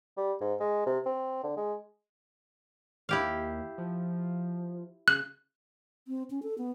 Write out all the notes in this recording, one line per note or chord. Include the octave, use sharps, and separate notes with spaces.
G3
G#2
G#3
C3
C4
D3
G#3
D#2 E4 G4 F5
F3
C#3 F#6
C4
C#4
A4
B3